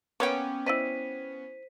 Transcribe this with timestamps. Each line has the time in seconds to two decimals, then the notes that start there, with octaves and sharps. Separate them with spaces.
0.20 A#3 B3 C#4 G5 D6
0.66 E4 C5 D5 D#5 B6 D#7